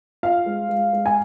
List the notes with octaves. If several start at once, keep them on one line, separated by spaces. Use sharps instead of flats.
F4 F5
G#3
G#3
G#3
G#5